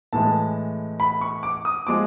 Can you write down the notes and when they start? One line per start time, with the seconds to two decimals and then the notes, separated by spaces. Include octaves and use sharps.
0.13 A2 E3 G#3 A5
1.00 B5
1.21 C#6
1.43 D6
1.65 D#6
1.87 F3 G#3 D6